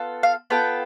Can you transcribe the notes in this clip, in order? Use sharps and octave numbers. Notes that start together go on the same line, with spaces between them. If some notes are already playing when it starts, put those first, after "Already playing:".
Already playing: B3 F4 A4
F5
B3 F4 A4 G5